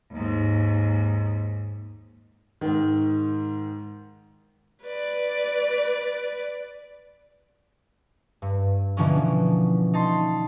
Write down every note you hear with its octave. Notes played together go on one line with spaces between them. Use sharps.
D#2 G#2
G#2 D#3
B4 D5
G2
B2 D3 E3 F3 A#3 C#4
D#4 A5 C6